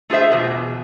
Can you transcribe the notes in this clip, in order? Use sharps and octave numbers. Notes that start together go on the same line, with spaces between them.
A3 F4 G#4 C5 E5
E2 B2